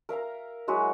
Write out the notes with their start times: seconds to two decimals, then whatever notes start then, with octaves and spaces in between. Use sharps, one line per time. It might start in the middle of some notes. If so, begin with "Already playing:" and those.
0.09 A#4 E5 F5 A#5
0.68 F#3 G#3 E4 F#4